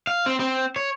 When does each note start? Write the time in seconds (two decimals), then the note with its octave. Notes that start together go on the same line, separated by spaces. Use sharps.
0.07 F5
0.26 C4
0.40 C4
0.76 C#5